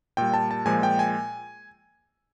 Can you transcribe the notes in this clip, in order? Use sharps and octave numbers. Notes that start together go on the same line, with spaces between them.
A#2 G3 G5
A5
A5
A#2 F3 G#3 G#5
G5
G#5